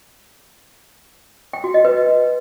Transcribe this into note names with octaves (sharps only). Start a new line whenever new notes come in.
G5
F#4
D#5
B4